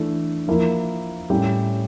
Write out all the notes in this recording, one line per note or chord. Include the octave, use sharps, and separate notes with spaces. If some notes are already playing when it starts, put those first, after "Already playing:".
Already playing: E3 A3 D4
F3 A#3 E4
A2 G3 C#4 E4 G4